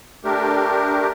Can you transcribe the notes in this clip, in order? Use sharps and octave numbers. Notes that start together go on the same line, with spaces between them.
A3 D4 G4 A#4